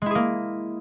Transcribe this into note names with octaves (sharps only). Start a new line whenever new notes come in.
G#3 A#3 E4 G#4